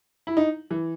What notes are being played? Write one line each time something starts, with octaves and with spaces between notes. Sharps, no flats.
E4
D#4
E3